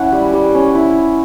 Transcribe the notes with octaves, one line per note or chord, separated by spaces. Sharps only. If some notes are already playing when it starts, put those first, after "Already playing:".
Already playing: C#4 E4 F#5
G3
G3
C#4
E4